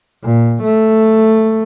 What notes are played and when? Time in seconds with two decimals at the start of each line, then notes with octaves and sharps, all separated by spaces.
0.23 A#2
0.63 A3